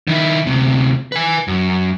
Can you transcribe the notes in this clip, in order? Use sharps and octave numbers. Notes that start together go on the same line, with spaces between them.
D#3 E4
D2 C3
B4 G#5
F#2